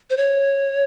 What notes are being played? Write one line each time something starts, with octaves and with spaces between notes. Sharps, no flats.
C5
C#5